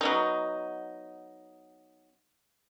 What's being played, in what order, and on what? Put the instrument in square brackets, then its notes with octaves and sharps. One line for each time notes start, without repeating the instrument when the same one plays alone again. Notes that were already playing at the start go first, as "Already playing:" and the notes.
[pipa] F#3 B3 D#4